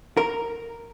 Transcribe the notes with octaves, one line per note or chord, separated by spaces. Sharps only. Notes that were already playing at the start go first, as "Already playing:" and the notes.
A#4